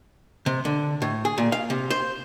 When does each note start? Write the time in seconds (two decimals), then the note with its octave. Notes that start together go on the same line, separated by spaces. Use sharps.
0.46 C3
0.65 D3
1.02 A2
1.25 G#4
1.38 A#2
1.52 F5
1.70 C3
1.90 C5